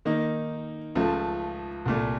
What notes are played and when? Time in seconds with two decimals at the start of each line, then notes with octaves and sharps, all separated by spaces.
0.05 D#3 A#3 D#4
0.95 C#2 C#3 F3 A3
1.85 C2 A#2 A3